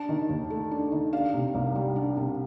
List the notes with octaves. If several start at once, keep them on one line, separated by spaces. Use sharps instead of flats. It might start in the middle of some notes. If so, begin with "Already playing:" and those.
Already playing: D4 A5
D#3
D#2
A3
D4
D#3
D4 F5
C3
C2
G3
D4
C3